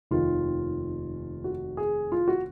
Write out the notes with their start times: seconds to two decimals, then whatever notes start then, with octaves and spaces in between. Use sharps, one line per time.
0.11 F1 D#2 D#3 F4
1.44 F#4
1.77 G#4
2.12 F4
2.28 F#4